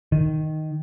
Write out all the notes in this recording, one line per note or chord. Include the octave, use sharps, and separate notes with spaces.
D#3